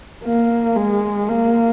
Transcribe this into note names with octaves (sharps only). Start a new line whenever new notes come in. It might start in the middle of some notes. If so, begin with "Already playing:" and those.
A#3
G#3
A#3